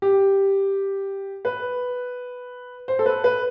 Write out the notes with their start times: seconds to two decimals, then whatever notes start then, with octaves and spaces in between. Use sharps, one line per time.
0.02 G4
1.45 B4
2.88 C5
2.99 A4
3.06 B4
3.24 B4